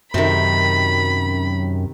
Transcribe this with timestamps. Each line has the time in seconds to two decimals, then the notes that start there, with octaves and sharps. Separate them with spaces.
0.14 F#2 C3 D#3 B5